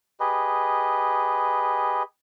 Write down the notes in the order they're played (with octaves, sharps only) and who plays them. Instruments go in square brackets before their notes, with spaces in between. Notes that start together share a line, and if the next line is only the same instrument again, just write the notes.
[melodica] G4 G#4 B4 D#5